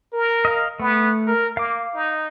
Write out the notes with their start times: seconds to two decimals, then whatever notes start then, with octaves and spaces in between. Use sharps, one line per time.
0.13 A#4
0.45 D#5 F5
0.80 A3 B3
1.27 A#4
1.57 A#3 F5 D6
1.94 D#4